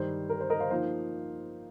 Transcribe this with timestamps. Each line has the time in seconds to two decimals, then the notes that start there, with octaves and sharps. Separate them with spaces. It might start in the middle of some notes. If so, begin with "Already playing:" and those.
Already playing: G2 D#3 G3 D#4 C5
0.30 A#4
0.41 C5
0.50 A#4 D#5
0.60 C5 F5
0.71 F3 A#3 D#4 C5 F5